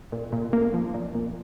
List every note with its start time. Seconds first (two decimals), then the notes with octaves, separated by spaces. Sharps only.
0.12 A#2
0.32 A#2
0.53 A#3
0.74 F3
0.94 A#2
1.15 A#2